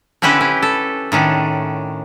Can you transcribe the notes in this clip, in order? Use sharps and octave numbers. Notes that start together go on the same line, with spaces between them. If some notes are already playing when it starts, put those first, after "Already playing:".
D3 C4 C#4 E4 G4 B4
C#4
A4
A2 D#3 C#4 D4